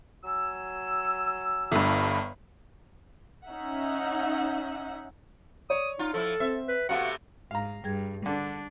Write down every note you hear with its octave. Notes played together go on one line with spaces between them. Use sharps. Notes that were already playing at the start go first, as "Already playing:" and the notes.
F#3 G#5 E6
G1 G2
C#4 D#4 E5 F#5
C#5 D5 D#6
D#4 F4
F3 E4 A4
C4 E5
B4
C3 A3 B3 F#4 F5 F#5
G#2 F5 A#5
G2 G3 G#4 G#6
D3 D4